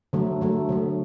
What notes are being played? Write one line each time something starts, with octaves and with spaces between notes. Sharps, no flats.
D3 F#3 A3
D3 F#3 A3
D3 F#3 A3